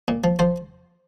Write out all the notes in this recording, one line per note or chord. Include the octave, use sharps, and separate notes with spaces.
A#2
F3
F3 C5